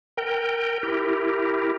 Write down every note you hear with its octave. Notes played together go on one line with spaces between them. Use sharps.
A#4 G5
E4 G4 A#4